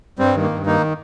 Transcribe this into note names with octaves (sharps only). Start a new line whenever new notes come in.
G2 G3 C4
D#3
A#3
G2
D#3 A#3 D#4